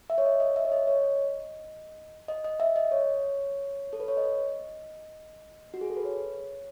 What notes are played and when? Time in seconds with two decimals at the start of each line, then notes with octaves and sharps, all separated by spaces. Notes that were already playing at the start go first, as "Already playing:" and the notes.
0.10 E5
0.18 C#5
0.25 D#5
0.40 D#5
0.56 E5
0.65 C#5
0.72 D#5
0.87 C#5
1.04 D#5
2.28 D#5
2.44 D#5
2.60 E5
2.76 D#5
2.91 C#5
3.93 A4
4.00 B4
4.08 C#5
4.17 D#5
5.74 F#4
5.81 G#4
5.90 A4
5.97 B4
6.05 C#5